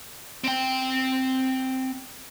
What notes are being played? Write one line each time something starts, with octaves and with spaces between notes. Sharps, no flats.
C4 G5